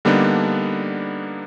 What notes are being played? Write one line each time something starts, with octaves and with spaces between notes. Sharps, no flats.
D3 G3 A#3 B3 D4 D#4